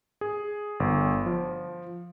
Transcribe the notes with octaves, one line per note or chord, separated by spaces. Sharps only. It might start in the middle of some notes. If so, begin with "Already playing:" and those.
G#4
G1
F3